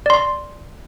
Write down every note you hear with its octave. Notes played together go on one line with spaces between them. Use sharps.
D5 C6